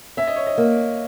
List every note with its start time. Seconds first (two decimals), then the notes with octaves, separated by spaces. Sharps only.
0.17 C#4 E5
0.27 D#5
0.36 C#5
0.47 D#5
0.58 A#3